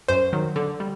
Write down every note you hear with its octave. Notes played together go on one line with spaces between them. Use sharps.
F#2 C5
D#3 F#3
D3
G3